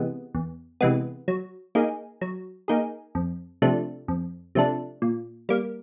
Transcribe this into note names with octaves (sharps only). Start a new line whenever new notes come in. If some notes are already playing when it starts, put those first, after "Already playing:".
Already playing: C3 E3 G#3 B3
E2
C3 E3 G#3 B3
F#3
A#3 D#4 G#4
F#3
A#3 D#4 G#4
F2
C3 F3 A3 D4
F2
C3 F3 A3 D4
A#2
G3 A#3